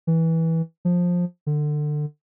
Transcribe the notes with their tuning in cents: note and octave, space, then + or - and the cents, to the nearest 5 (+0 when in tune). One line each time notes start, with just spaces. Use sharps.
E3 -15
F3 +15
D3 +25